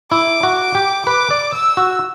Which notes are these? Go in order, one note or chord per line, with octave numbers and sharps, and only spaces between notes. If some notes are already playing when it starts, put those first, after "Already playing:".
E4 D6
F#4
D6
G4
B4 D6
D5
E6
F#4